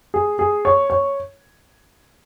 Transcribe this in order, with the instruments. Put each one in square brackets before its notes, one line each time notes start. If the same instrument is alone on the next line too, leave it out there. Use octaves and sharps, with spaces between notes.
[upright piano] G#4
G#4
C#5
C#5